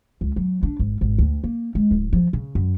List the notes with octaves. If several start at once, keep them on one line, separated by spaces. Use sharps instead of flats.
C#2
F#3
D4
G#1
G#1
D2
A#3
G#3
D1
F3
C#3
F#2